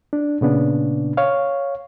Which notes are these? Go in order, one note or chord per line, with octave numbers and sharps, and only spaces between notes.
D4
A#2 C#3 B3 D4
C#5 F5